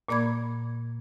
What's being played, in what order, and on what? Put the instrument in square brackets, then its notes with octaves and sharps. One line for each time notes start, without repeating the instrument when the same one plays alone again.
[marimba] A#2 A#3 D5 B5 G#6